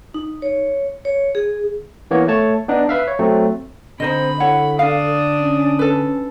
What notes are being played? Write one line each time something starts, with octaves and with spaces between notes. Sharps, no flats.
D#4
C#5
C#5
G#4
E3 A#3 B3 C#5
A3 C#5 A5
B3 D4 D#4
B4 E5 F5
C#5
F#3 A3 C4
D3 C4 D#4 C5 D#5 B5
E4 A4 C#5 F#5
D4 F5 D#6
C#4
A4 B4